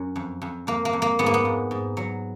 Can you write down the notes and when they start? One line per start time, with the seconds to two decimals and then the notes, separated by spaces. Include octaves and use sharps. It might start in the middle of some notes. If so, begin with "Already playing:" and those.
Already playing: F#2
0.16 F2
0.42 F2
0.67 F2 A#3
0.85 A#3
0.93 F2
1.02 A#3
1.19 G#2 B3
1.26 A#3
1.34 B3
1.45 G#2
1.71 G#2
1.97 F#3